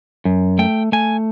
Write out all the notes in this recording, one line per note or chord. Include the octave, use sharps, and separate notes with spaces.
F#2
A3 G5
A3 G#5